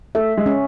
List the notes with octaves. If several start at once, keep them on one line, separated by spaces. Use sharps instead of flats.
A3 E5
G#3
C#4